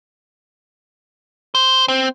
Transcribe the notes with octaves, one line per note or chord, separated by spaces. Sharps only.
C5
C4